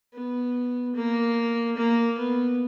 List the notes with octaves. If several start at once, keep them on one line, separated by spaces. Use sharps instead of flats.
B3
A#3
A#3
B3